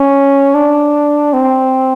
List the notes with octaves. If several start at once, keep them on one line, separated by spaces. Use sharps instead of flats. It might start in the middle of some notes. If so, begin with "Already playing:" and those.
Already playing: C#4
D4
C4